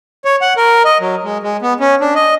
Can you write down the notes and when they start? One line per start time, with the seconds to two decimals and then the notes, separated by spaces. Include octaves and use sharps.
0.25 C#5
0.41 F#5
0.57 A#4
0.85 D#5
1.00 F#3
1.24 G#3
1.43 G#3
1.62 B3
1.80 C#4
2.01 D4
2.15 D#5